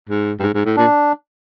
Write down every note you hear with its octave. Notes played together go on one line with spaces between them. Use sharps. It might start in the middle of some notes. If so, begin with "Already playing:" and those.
G#2
G2
G#2
G#2
A2
A#2 D4